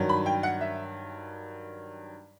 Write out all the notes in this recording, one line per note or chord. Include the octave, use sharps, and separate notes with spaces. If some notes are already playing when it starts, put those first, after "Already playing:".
Already playing: G2 D#3 F#3
B5
G5
F#5
E5